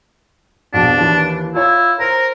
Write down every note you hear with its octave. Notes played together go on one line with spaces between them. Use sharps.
A#1 F2 B2 D4
D#2 E3
E4 F4 C#5
A#4 C5